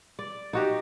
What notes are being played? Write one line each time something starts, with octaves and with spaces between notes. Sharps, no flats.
D5
D#4 F#4 G4